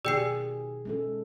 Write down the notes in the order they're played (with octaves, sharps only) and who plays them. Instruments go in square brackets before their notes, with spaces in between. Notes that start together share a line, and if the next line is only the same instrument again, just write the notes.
[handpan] B2 D#3 G#4 [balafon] G4 [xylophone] D5 G5 C7
[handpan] G#3 C#4 A4